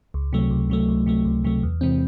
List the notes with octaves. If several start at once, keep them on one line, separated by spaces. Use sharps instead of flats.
C#2
C3 F#3 A3
C#2
C3 F#3 A3
C#2
C3 F#3 A3
C#2
C3 F#3 A3
E2
C3 E3 G#3 C4